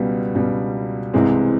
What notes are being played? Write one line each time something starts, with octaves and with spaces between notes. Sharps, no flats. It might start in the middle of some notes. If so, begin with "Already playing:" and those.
Already playing: C#2 B2 G3 B3
C#2 B2 G3 B3
C2 C3 E3 G#3 C4